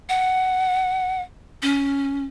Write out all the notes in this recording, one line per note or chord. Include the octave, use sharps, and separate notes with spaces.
F#5
C#4